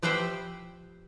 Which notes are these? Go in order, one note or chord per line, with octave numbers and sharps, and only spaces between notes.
F3 G4 B4 C5 E5 G5